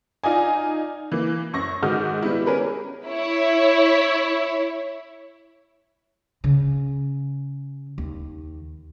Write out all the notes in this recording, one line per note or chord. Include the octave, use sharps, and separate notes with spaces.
D#4 F4 D5 D#5 G#5
E3 A#3
F#2 C#6 A#6
G#2 D#3 F#4 D#6 F6 G6
G3 B3 E4
C#4 G#4 A#4 B4
E4 C#5
C#3
D#2